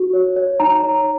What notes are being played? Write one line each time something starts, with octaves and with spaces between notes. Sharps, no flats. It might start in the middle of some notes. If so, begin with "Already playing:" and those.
Already playing: F#4
C#5
C#5
D#4 A#5
C#5